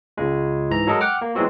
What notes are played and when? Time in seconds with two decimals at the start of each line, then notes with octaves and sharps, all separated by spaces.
0.17 C#2 C#3 G#3
0.70 G#2 E3 A#5
0.87 F#3 G#3 A4 A#4 D#5
1.01 F#5 G5 D6 F6
1.21 A#3
1.35 E3 F#3 G#3 B3 C4 F#4